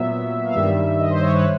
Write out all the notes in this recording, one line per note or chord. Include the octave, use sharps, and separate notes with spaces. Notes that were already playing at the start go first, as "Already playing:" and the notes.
Already playing: A#2 F#3 B3 E5
F5
G2 D#3 G3 E5
D#5
C5
C#5
B4